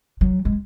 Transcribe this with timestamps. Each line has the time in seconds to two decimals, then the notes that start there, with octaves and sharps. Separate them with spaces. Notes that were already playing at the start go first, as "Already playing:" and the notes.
0.21 F#3
0.45 G#3